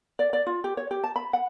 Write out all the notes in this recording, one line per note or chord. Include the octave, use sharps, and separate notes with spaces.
D5
D5
F4
G4
C#5
G4
A5
B5
F#5